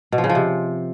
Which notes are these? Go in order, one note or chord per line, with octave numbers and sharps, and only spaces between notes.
B2
F3
C#3
F3
C3